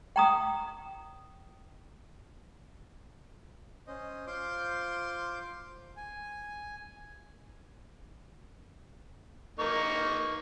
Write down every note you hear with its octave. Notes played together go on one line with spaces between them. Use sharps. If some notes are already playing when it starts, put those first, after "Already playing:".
G5 A#5 D#6
C#4 C5 D#5
F4 C5 C6 D6 G6
G#5
A#3 D#4 C#6